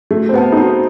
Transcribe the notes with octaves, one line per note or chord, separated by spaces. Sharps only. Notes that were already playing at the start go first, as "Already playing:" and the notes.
A3 F#4
C4
B3 B4 F#5 A5
D#4
C4 F#4